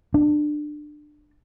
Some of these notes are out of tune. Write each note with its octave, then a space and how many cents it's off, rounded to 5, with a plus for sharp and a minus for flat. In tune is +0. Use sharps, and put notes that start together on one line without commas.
D4 +25